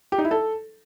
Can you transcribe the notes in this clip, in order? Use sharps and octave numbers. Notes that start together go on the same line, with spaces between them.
G4
D#4
E4
A4